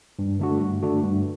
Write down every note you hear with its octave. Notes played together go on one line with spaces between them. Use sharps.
G2
D3 A3 D4 F#4
G2
D3 A3 D4 F#4
G2